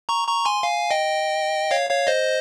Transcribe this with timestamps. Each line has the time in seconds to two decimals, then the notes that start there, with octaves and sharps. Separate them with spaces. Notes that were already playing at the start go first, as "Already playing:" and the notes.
0.09 A#5 C#6
0.27 A#5 C#6
0.45 G#5 C6
0.63 F5 G#5
0.91 D#5 G5
1.71 C#5 F5
1.90 C#5 F5
2.07 C5 D#5